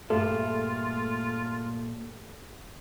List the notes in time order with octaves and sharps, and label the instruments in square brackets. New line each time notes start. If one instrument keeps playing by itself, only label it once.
[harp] G2 G#4 B4 [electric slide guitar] A#2 A#3 A4 [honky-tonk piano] A3 [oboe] F4